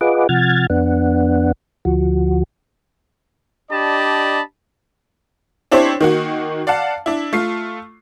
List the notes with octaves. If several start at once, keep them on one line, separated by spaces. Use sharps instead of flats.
F4 G#4 B4 D#5 F#5 D6
C3 F3 F#5 F6 G#6 A6
F2 B3 D4 F#5
D2 F3 F#4
D4 G4 D5 D#5 A5 B5
C4 D4 E4 G4 C5 C#5
D#3 A#3 F#4
D5 F5 F#5 A5
D4 E4
A3 F4 C7